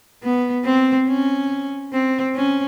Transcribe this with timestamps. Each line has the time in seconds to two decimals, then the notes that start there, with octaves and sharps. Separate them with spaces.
0.23 B3
0.65 C4
1.08 C#4
1.93 C4
2.35 C#4